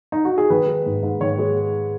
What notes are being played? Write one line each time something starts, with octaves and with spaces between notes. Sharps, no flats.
D#4
F#4
G#4
D#3 B4
G#3
G#2
G#2
D#3 C#5
G#3